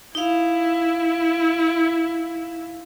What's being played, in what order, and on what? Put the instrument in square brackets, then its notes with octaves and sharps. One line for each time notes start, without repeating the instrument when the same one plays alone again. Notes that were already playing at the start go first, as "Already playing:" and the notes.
[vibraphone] D#4 F5 [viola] E4